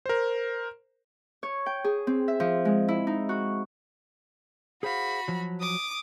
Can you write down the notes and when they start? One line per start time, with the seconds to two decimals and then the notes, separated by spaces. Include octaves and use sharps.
0.06 A#4 C5
1.43 C#5
1.66 G5
1.84 G#4
2.07 C4
2.28 E5
2.40 F3
2.65 G#3
2.88 E4
3.07 D#4
3.29 F#4
4.83 F#4 G#4 C5 F5 B5
5.28 F3 F#3
5.61 D6 D#6